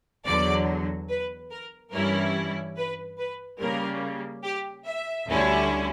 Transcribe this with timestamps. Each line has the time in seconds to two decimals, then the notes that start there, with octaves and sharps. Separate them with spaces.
0.25 E2 D3 F#3 D5
1.09 B4
1.51 A#4
1.92 G2 E3 G3 C#4 E4 A#4
2.77 B4
3.18 B4
3.60 C#3 G3 A#3 A#4
4.43 G4
4.86 E5
5.28 D2 D3 G3 C#4 E4